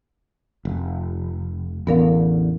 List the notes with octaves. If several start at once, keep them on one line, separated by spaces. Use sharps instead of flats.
F1
A1 E2 D3 B3 A#4 F5